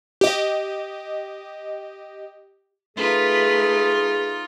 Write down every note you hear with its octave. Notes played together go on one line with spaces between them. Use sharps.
G4 D#5
A3 D#4 F4 G#4 B4